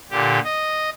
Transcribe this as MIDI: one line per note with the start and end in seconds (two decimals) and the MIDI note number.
0.10 0.39 46
0.10 0.39 50
0.10 0.39 67
0.44 0.90 75